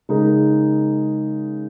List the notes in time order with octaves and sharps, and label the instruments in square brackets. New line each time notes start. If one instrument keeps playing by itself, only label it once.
[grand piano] C#3 G#3 D#4 A#4